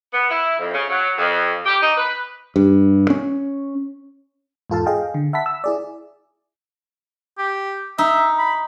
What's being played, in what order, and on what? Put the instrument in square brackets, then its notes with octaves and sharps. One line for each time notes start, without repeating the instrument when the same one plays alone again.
[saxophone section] B3
E4
F2
C#3
F#3
F2
G4
D#4
B4
[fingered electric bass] G2
C#4
[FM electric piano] E2 G#2 F4 A4 F5 A5
G#4 D#5 F5 G5
D3
E5 F#5 A5 B5 B6
E6
E4 G#4 D5
[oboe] G4
[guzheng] D#4 [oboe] E5
[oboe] B5